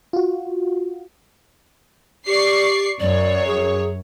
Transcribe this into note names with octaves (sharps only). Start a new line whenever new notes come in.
F4 F#4
G4 D5 C#6 C7
F#2 C#5 D5
G#4